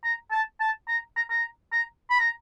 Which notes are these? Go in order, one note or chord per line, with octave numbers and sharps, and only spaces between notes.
A#5
A5
A5
A#5
A#5
A#5
A#5
B5
A#5